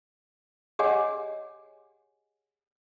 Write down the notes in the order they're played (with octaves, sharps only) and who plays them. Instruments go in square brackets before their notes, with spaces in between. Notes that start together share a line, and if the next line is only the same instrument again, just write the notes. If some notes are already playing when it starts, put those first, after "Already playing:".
[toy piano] G4 G#4 C#5 D#5 F#5 G#5